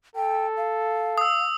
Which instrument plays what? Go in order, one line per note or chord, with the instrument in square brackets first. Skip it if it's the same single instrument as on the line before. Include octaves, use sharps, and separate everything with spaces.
[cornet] A4 [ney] G5
[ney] F5
[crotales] D#6 E6